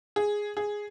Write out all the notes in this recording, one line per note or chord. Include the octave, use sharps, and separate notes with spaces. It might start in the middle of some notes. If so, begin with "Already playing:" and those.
G#4
G#4